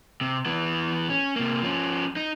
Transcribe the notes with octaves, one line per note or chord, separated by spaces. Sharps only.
C3
E3 B3
C#4
C3 A#3
F3 C#4
D#4